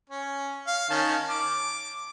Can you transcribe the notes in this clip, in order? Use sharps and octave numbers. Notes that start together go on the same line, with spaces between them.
C#4
F5
D#3 C#4 A5
D6